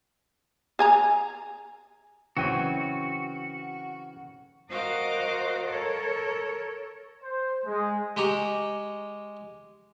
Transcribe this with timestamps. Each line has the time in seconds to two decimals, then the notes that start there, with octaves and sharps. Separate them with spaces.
0.79 G#4 G#5 A#5
2.37 C#3 E3 F#3 C4 F#4 G5 D#7
4.71 F#4 A#4 C5 D#5 F5 D6
5.68 A4 A#4 C#5
7.23 C5
7.66 G#3
8.17 G#3 G4 A#5 C#6